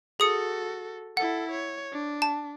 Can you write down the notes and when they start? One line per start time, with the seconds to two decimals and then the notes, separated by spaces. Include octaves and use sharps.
0.20 F#4 G#4 A4 D#6 C#7
1.17 E4 A4 F#5
1.51 C#5
1.92 D4
2.22 A5